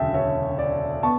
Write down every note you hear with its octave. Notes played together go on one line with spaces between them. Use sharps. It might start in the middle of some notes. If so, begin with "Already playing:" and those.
Already playing: E1 D2 C#3 F#3 E5 G5 A5
C#5 E5
D5
B3 A5 C#6